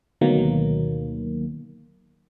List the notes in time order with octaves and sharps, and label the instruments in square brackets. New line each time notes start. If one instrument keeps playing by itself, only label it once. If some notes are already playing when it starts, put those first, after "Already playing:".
[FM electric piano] D2 B2 D#3 F#3 A#3